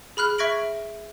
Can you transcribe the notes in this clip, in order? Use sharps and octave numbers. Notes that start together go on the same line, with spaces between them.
G#4 B5 F6 F#6
E5 C#6 G#6 A#6 D7 F#7